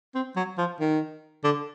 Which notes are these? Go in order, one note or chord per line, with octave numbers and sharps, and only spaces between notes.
C4
F#3
F3
D#3
D3